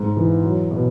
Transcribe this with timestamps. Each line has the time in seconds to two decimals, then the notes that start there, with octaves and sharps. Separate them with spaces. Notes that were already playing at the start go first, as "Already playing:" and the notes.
Already playing: G#2
0.17 E3
0.43 F#3
0.71 B2